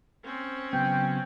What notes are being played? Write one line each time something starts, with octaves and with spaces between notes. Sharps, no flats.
C4 C#4
C#3 F#3 B3 G5